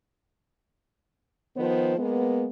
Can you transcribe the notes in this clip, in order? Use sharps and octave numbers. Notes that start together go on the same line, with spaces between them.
D#3 F3 B3 C5
G#3 A#3 B3